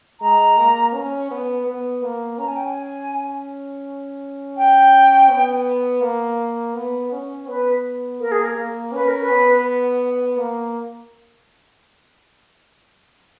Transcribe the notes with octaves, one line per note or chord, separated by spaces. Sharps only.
G#3 A#5
A#3
C#4
B3
B3
A#3
C#4 A#5
G#5
G5
G#5
G5
B3
A#3
B3
C#4
B3 B4
A#3 A#4
G#4
A#4
A#3
C#4 B4
A#4
B4
B3
A#3